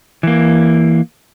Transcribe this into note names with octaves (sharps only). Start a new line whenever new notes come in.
E3 A#3